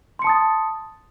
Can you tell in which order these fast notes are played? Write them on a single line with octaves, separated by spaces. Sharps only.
C6 C#7 A5 D#6 A6